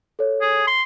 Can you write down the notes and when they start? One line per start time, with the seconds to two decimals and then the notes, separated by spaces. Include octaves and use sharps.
0.19 A4 C#5
0.41 G#4
0.67 C6